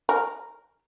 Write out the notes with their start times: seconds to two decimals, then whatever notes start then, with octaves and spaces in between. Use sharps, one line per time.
0.09 A#4